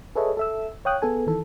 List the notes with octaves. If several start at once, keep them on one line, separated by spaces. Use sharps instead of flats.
G#4 A4 B4 C#5 D#5 E5
A4 E5 E6
C#5 F5 G5 D#6 F#6
B3 G#4 A4 G#5
D#3 E3 A4